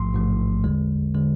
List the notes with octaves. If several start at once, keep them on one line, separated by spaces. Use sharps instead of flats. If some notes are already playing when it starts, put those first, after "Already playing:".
Already playing: A1 G#2 F3 A3 C6
A1 G#2 F3 A3
E2 D3 G#3
D3 G#3